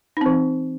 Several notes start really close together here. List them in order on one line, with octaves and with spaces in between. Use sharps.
D#4 C4 E3